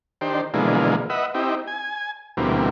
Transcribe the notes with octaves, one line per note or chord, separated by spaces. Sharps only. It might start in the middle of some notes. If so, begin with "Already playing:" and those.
D#3 D4 G4 C5
B2 D3 E3 F3 G#3 A#3
B4 D#5 E5 F#5
C4 D#4 E4 G4
G#5
D2 B2 E3 G3 A#3 C4